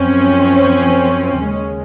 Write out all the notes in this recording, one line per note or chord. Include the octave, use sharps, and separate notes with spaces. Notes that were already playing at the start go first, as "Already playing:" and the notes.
Already playing: F#2 F3 C4 C#4
D#2 C#3 G#3